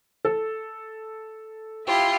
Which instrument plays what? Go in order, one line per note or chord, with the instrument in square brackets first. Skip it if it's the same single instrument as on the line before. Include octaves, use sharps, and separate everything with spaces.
[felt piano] A4
[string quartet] E4 F4 G4